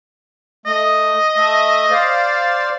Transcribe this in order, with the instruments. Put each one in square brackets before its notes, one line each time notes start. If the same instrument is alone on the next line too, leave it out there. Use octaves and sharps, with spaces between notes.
[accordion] A3 [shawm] D#5
[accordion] A3 E5
C5 D5 F5